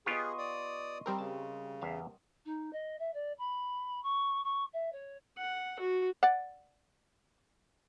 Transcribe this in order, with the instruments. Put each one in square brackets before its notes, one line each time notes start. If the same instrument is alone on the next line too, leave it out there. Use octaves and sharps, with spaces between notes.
[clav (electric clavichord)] B3 F4 G4 [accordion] G#4 [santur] D#5 C6 C#6
[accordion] D5 D#6
[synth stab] G3 C4 A#4
[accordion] C#3 [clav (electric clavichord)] A5
[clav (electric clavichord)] E2 E5 F5
[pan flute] D#4
D#5
E5
D5
B5
C#6
C#6
E5
C#5
[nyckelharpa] F#5
F#4
[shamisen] D5 F#5